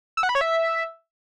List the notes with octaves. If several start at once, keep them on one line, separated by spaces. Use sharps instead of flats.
E6
F#5
B5
C#5
E5